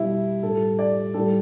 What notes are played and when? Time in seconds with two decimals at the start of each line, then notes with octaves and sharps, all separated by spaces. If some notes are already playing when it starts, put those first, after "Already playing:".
Already playing: B2 G3 E4
0.42 A2 G3 A4
0.79 D5
1.14 A2 G3 A4